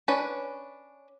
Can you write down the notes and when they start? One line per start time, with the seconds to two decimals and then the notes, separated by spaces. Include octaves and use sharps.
0.08 C#4 D4 B4